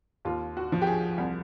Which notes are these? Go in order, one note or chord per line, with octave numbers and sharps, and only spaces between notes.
D#2 F4
F#4
F3
G4
G#4
C2